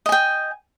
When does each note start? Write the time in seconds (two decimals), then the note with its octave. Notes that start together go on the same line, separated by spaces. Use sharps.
0.06 D#5
0.09 G#5
0.12 G5